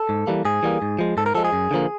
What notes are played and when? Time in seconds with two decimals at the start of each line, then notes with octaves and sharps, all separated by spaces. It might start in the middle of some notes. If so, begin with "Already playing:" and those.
Already playing: A4
0.09 G#2
0.27 E3 G3 A#3
0.45 G#2 G#4
0.63 E3 G3 A#3
0.82 G#2
0.99 F3 G#3
1.17 G#2 A4
1.26 A#4
1.35 F3 G#3 A4
1.45 G#4
1.53 F#2
1.71 D3 F3 A#3